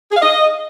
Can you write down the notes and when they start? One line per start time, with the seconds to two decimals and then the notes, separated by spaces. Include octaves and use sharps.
0.11 G#4
0.17 F5
0.22 D#5